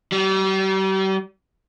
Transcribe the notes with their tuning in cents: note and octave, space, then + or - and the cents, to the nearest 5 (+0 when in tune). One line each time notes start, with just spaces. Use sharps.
G3 -40